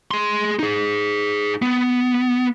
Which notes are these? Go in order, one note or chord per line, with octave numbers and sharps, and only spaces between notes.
G#4 C6
D#4 G#4
B3